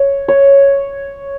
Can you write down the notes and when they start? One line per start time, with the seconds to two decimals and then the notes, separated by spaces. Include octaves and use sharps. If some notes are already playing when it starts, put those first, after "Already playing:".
Already playing: C#5
0.28 C#5